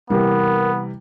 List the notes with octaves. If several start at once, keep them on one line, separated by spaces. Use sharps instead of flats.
C3 E3 G3 B3 A#4